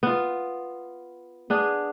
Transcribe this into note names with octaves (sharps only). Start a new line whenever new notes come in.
B3 F4
B3 D4 G#4